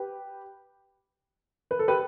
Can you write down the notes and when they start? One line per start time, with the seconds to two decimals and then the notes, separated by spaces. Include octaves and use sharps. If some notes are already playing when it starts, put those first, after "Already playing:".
Already playing: G4 B4
1.71 B4
1.79 A4
1.88 G4 B4